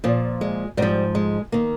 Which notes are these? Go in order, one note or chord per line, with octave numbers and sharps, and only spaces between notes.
A#2 F3
G#3
G#2 F3 G3
G#3
D#3 A#3